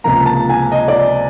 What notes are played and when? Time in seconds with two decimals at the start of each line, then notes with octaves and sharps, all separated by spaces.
0.04 C#2 C3 F3 A#3 A#5
0.26 A5
0.49 G#5
0.72 D#5
0.88 D5